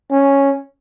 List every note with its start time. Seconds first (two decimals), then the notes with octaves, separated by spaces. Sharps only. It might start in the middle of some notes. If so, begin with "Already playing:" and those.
0.11 C#4